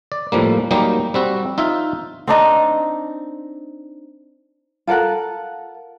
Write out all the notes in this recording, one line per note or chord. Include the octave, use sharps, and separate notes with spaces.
D5
A2 F3 G3 A#3
F#3 G3 A#3 D#4 G4
G3 C4 F#4
D#4 F4 E5
C4 D4 D#4
F4 A4 A#4 F#5